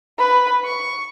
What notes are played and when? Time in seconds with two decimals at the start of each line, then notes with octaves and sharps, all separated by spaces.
0.19 B4 B5
0.64 C#6